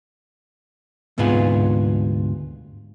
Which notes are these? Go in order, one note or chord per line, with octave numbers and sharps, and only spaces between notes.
D2 G#2 C3 B3 F4 G#4